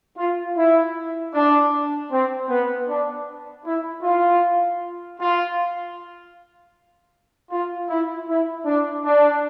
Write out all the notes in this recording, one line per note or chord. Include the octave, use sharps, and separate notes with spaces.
F4
E4
D4
C4
B3
D4
E4
F4
F4
F4
E4
E4
D4
D4